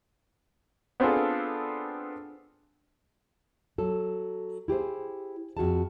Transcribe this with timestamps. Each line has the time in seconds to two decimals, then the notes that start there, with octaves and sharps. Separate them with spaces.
1.00 B3 C4 D4 F4 G#4 A4
3.78 F#3 A4
4.68 E4 G4 G#4 C5
5.57 F2 F#4 G#4 A5